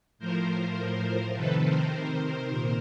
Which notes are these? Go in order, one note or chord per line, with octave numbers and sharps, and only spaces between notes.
A2 F3 A#4 C5
C3 D#3 A4 B4
A#4 C5
A#2